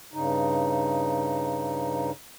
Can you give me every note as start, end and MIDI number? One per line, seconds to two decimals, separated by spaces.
0.14 2.11 43
0.14 2.11 49
0.14 2.11 63